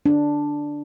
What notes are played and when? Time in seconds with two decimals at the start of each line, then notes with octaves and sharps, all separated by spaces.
0.06 D4